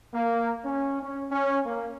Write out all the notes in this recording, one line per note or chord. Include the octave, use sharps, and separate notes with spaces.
A#3
C#4
C#4
C#4
A#3